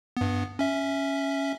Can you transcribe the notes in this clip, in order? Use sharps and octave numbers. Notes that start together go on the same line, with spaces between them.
G2 B3
C#4 E5